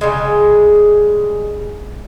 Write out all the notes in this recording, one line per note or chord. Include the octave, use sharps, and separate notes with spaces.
C#3 G3 G#3